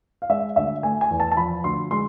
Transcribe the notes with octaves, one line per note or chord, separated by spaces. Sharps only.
F5
G#3 E5
D2 E5
A3 G#5
G#5
E2
A5
A5
F3 B5
D2 C6
G#3 C6